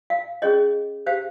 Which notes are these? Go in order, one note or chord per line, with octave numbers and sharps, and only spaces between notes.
F5
C#4 G#4 C#5 D#5
G4 C5 F5